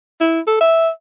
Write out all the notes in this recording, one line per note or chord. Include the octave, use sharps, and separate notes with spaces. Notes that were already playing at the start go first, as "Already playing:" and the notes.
E4
A4
E5